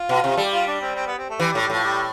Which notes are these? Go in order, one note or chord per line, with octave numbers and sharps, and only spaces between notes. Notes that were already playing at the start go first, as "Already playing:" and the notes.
Already playing: F4
B2
C3
G3 A4
G4
F4
D4
C4
C4
B3
C4
A3
E3 G3
G3
A2
G3
A2 F3
G3